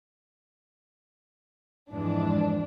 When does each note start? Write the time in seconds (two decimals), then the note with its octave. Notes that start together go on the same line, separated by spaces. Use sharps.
1.91 F2 G#2 E3 G#3 D4